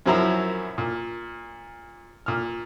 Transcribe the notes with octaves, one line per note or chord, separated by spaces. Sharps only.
F#2 F3 F#3 E4 A#5 E6
A#2
A#2 F6